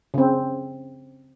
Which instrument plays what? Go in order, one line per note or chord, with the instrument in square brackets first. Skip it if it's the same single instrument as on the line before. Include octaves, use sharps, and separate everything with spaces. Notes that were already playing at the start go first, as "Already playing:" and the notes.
[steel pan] C#3 C4